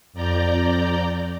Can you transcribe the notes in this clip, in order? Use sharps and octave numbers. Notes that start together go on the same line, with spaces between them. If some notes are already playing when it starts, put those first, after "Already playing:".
F2 D5 A#5 G6